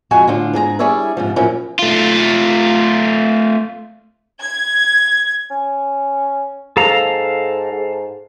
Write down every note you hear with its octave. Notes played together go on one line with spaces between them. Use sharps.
F2 G#3 F#4 D#5 G#5
A2 D3 F4
G#2 G#4 B4 A#5
G3 E4 G#4 C#5 D5 E5
G#2 C3 F3
A#2 F3 F#3 A#3 C#4 E4
A3 F4
G#6
C#4
G#2 A4 F5 A#5
G#2